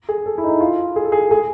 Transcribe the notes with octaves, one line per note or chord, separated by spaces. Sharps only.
G#4
A4
E4
D#4
E4
F4
G#4
A4
G#4
G#4